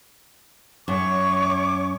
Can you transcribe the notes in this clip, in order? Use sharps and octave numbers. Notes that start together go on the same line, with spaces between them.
F#2 C#5 C#6 D6